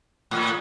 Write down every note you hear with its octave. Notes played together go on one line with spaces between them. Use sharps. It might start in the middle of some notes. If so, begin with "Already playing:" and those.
A2